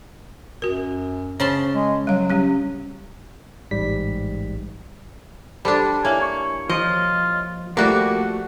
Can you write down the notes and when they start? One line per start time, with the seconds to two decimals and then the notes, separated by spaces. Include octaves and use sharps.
0.62 F#2 F#4 A#4
1.40 C#3 C5 A5 C6
1.74 G#3
2.07 F#3 G3 F5
2.30 G3 C#4 G4
3.71 A1 G#2 G3 B6
5.65 G3 D4 A4 C5 B5
6.05 A#3 E4 C#5 G#5
6.22 C#6
6.69 F3 F4 D#5
7.77 F3 G3 A3 A#3 F#4 F#5